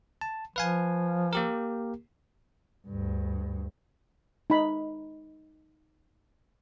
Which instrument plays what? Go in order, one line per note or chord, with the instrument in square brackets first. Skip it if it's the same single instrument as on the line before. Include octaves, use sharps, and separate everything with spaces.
[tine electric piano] A5
[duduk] F3 [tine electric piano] B4 F5 G#5
[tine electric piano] A#3 G4 A#4
[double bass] D2 G2
[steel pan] D#4 B5